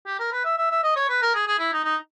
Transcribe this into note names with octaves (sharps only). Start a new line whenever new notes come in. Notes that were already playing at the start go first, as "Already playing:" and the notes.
G4
A#4
B4
E5
E5
E5
D#5
C#5
B4
A#4
G#4
G#4
E4
D#4
D#4